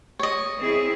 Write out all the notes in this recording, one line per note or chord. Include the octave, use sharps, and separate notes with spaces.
C#5 D#5
C4 E4 G#4